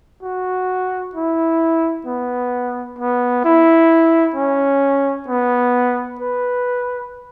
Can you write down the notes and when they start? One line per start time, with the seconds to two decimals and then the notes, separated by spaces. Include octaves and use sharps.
0.23 F#4
1.15 E4
2.06 B3
2.99 B3
3.44 E4
4.36 C#4
5.28 B3
6.20 B4